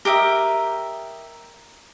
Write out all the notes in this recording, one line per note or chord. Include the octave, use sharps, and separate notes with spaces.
G4 A#4 D#5 E5